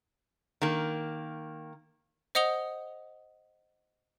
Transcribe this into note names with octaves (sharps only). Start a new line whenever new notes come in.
D#3 A#3
C5 D#5 F#5 D#6 F7 G7